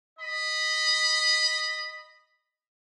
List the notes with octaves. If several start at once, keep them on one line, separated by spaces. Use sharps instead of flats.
D#5 B5